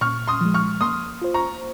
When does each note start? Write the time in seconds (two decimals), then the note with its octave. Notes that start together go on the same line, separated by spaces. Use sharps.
0.01 A#2 C#6 F6
0.28 C6 D#6
0.41 F3 G#3
0.54 C#6 F6
0.81 A#3 C6 D#6
1.22 F4 C5
1.34 A#5 C#6